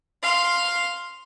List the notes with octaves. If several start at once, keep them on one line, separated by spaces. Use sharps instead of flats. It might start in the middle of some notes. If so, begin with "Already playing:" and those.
F5 C6